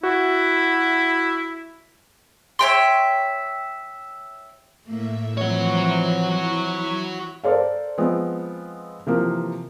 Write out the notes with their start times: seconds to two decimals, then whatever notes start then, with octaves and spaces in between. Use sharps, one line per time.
0.03 E4 F#4
2.59 C#5 E5 G5 C6
4.86 A2 A3 A#3 E5
5.38 E3 F3 C4 F#4 C#5
6.33 E4 B5 C#6
7.44 A4 A#4 C5 D5 F5
7.98 F3 G#3 B3 C4
9.07 C3 E3 F3 A#3